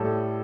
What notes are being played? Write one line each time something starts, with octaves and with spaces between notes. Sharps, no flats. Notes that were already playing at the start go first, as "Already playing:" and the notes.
Already playing: A2 G3 A4